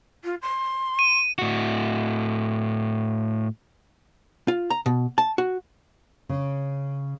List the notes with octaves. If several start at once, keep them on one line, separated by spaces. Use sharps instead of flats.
F4
C6
D#7
A2 F#4
F4
A#5
B2
A5
F#4
C#3